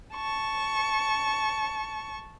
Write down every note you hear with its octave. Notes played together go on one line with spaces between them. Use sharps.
A5 C#6